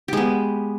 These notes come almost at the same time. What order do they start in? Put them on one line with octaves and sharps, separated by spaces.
G4 G#3 B3